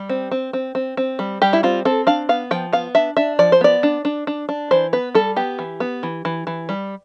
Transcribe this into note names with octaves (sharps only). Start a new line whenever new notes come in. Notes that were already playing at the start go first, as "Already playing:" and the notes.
Already playing: G3
C4
C4
C4
C4
C4
G3
G3 G4
E4
C4 F4
C4 A4
D4 F5
B3 F5
F3 G5
B3 F5
D4 E5
D4 E5
F3 D5
C5
B3 D5
D4
D4
D4
D4
E3 C5
B3 B4
G3 A4
B3 G4
E3
B3
E3
E3
E3
G3